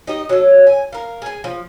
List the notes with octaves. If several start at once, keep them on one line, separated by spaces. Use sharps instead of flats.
D#4 G4 D#5
F#3 A4
G#5
A#4 F5
G#4 G#5
F3